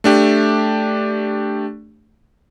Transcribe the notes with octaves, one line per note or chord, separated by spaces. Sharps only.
A3 D4 G4